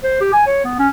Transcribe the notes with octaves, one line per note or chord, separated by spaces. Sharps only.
C5
G4
G#5
C#5
B3
C#4